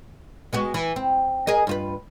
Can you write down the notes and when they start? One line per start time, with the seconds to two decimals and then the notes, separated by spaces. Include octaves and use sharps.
0.53 G#3 B3 F#4
0.74 E3
0.96 C4
1.47 G#4 A#4 D#5
1.67 G2 F4 B4